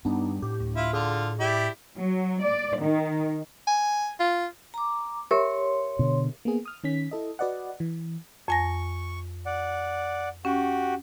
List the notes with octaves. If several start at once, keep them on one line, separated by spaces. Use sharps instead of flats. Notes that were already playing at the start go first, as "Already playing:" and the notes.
G2 G3 B3 D4 D#4
A2 G4
D2
E4 F4
D3 F4 G#4
E4 G4 D5
F#3
D5
D#3
G#5
F4
A#5 D6
G4 A#4 C#5 E5 C6
B2 D3
A#3 B3 G#4
D#6 F6
D#3 C#4 B6
E4 A4 D#5
F#4 B4 D5 D#5 F#5
E3
F2 G#5 C#6 A#6
D5 F#5
C#4 F#4 G4 F#5